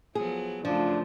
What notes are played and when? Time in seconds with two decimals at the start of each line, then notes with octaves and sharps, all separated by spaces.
0.15 F3 F#3 B3 G#4
0.65 F#2 C#3 F3 A3 D4 F4